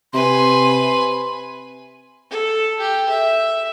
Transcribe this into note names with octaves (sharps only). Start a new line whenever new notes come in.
C3 B4 G#5 C6
A4
G4
E5